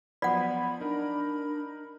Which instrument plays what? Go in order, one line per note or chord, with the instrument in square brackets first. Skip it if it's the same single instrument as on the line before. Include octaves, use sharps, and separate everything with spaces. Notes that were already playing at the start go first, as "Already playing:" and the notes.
[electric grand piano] F3 F#3 B3 [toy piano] D5 F#5 [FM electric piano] B5
[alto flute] D4 [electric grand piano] D#4 A#4